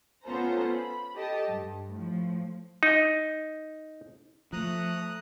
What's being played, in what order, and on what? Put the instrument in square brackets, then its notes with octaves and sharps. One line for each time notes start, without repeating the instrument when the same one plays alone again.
[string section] B3 C#4 F4 A4 C5 A#5
B5
G4 A4 D#5 A5
G2
A2 F3
[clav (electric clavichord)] D#4
[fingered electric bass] F3 [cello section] A3 [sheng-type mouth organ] A#5 D#6 F#6